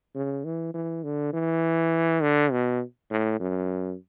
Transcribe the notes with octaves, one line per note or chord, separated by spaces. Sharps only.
C#3
E3
E3
D3
E3
D3
B2
A2
F#2